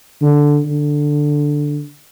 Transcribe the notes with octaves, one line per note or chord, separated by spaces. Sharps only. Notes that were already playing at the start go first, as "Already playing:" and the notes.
D3
D3